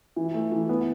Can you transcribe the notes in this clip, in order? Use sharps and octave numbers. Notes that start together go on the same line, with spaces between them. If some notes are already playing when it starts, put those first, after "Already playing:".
E3
A3
E3
B3